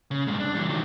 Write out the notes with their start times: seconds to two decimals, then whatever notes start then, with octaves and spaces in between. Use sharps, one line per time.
0.11 C#3
0.27 G2 G#3
0.40 D4
0.55 E3 G3
0.69 D#3 F#3